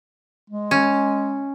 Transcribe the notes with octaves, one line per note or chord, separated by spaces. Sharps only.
G#3
C#4